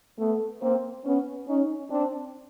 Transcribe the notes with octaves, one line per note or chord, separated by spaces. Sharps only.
A3 B3
A#3 C4
B3 C#4
C#4 D#4
C4 D4